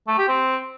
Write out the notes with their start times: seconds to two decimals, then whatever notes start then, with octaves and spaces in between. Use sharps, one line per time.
0.08 A3
0.18 G4
0.28 C4